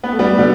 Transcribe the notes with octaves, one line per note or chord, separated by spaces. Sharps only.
B3
A3
G3 B3
D3 G3